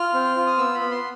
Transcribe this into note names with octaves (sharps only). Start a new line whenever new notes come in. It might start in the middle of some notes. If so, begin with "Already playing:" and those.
Already playing: F4 F6
C4
F4
D#6
B3 E6
B5
B3
C6